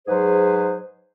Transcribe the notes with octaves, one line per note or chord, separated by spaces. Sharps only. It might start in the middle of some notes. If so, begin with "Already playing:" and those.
G#2 F#3 G#4 B4 C5